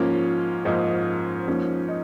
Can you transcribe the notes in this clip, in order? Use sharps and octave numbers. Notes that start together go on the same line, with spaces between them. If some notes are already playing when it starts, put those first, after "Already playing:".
Already playing: G#2 F3 A#3 C#4 F4
G#2 F3 A#3 D#4
G#2 F3 A#3 C#4
D#4